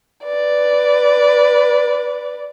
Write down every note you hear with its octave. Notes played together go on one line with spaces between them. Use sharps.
B4 D5